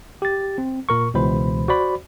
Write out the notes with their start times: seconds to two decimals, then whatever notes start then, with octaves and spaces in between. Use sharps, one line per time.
0.22 G4 A6
0.58 C4
0.89 A#2 A#4 C#6
1.14 C#2 B2 E3 C5 B5
1.68 F#4 C5 D5 B5